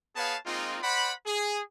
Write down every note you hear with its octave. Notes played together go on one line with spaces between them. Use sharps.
B3 G#4 B4 C#5 F5 A5
G#3 A#3 C4 D#4 F4
C5 D5 F#5 B5
G#4